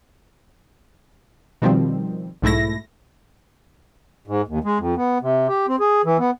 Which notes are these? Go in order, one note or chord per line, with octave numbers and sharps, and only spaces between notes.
B2 D#3 F3 G3 C4
B1 G#2 A3 E4 A#6
G#2
D#2
G#3
F2
B3
C3
G4
C4
G#4
E3
B3